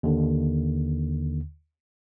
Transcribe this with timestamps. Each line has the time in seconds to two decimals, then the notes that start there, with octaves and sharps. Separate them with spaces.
0.03 D#2 D3